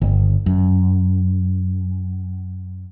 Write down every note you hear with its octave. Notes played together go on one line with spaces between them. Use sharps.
G1
F#2